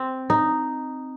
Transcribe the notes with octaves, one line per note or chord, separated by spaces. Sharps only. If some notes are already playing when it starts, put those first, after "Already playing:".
Already playing: C4
D#4